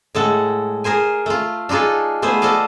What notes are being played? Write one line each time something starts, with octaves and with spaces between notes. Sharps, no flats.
A2 G#3 A4 F#5
G#4 A#4 C5 G#5
A3 F4
D4 D#4 F4 G#4 A4
A3 B3 G#4 C5
A4 C5 D5 D#5 F5